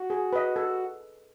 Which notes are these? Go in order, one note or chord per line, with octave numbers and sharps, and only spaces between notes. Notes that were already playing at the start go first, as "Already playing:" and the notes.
Already playing: F#4
G#4
B4 D#5
A4